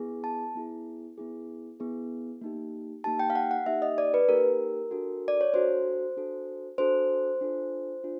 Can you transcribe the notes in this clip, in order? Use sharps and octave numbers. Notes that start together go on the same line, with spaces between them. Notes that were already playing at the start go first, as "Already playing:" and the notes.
Already playing: B3 E4 G#4
A5
B3 E4 G#4
B3 E4 G#4
B3 E4 G#4
A#3 D#4 G4
A#3 D#4 G4 A5
G5
F5
F#5
F#5
A#3 D#4 G4 E5
D#5
D5
B4
A#3 D#4 G4 A#4
D4 F#4 A4
D5
C#5
D4 F#4 A4 C5
D4 F#4 A4
D4 F#4 A4 C5
D4 F4 A4
D4 F4